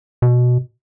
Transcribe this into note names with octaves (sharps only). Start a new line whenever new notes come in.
B2